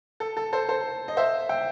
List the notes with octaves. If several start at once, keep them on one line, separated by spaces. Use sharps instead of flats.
A4
A4
A4 C5
A4 C5
D#5
C5 E5
E5 G5